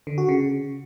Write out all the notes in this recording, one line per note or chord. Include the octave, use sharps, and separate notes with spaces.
D3
F#4
C#3